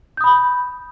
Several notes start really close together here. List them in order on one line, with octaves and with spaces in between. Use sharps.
G6 D#6 B5